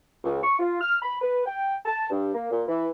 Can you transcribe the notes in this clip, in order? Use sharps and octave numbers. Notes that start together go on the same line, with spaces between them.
C#2
C#6
F4
F6
B5
B4
G5
A5
G2
A#3
A#2
E3